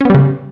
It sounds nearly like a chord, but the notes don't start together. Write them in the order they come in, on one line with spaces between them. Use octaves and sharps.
C#4 B3 G3 C#3